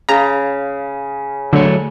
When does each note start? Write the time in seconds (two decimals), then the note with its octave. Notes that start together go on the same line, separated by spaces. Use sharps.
0.09 C#3 A#5
1.53 D3 F#3 A3 C#5